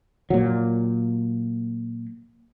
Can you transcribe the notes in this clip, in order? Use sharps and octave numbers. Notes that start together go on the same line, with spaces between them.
A#2 F#3